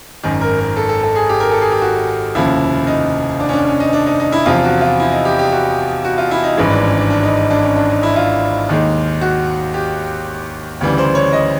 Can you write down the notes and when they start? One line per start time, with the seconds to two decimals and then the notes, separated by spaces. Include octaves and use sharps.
0.23 G#1 F#2 D#3
0.41 A#4
0.59 A#4
0.76 A4
0.89 A4
1.03 A4
1.16 G#4
1.29 G4
1.40 A#4
1.51 A4
1.61 G#4
1.72 G4
1.81 F#4
2.35 F1 D#2 C#3 F3 E4
2.87 D#4
3.40 D4
3.49 C#4
3.53 D4
3.67 C#4
3.80 D#4
3.93 D4
4.06 D#4
4.20 D#4
4.32 E4
4.46 E2 C3 F3 F4
4.64 F#4
4.81 F4
5.00 E4
5.12 D#4
5.25 G4
5.39 G4
5.52 F#4
6.05 F#4
6.18 F4
6.31 E4
6.44 D#4
6.57 G#1 G2 E3 G#3 C#4
6.70 D4
6.83 C#4
6.97 D4
7.10 D4
7.23 D#4
7.36 D#4
7.50 D4
7.63 C#4
7.76 D4
7.90 D#4
8.03 E4
8.16 F4
8.69 D#2 D#3 G#3
9.21 F#4
9.74 G4
10.81 D2 C#3 E3 G3
10.98 C5
11.15 C#5
11.33 D#5